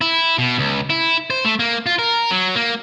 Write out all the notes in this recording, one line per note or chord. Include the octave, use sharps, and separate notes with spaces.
E4
B2
C#2
E4
C5
A3
A#3
F4
A#4
F#3
A#3